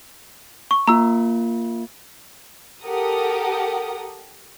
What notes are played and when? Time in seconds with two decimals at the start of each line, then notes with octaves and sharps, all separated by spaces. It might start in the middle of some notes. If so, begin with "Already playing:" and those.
0.71 C#6
0.88 A#3 F4 A#5 E6
2.83 G4 A4 A#4 F#5 D#6